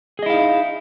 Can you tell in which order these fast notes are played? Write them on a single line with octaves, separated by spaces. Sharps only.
G#4 D#5 E4 F5 D#4